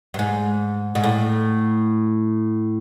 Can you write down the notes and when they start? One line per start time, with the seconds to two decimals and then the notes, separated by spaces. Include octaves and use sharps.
0.14 G2
0.19 G#2
0.95 G#2
1.04 A2